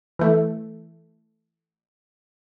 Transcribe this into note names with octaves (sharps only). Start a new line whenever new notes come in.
E3 A3